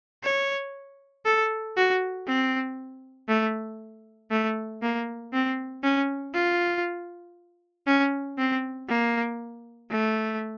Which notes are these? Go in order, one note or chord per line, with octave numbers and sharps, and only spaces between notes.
C#5
A4
F#4
C4
A3
A3
A#3
C4
C#4
F4
C#4
C4
A#3
A3